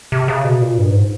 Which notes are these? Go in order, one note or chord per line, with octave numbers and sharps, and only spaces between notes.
C3
C#3
B2
A#2
G2
G#2